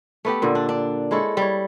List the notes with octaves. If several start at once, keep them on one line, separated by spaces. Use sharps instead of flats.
A3 B3 G4
A#2 D3
D4
D4
G#3 E4 A4 C#5
G3 C#5